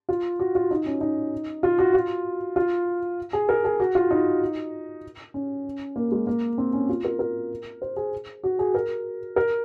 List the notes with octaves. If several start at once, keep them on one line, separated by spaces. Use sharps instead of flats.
F4
F#4
F4
D#4
C#4
D#4
F4
F#4
F4
F4
G#4
A#4
G#4
F#4
F4
D#4
C#4
A#3
G#3
A#3
C4
C#4
F4
A#4
A#4
C5
G#4
F#4
G#4
A#4
A#4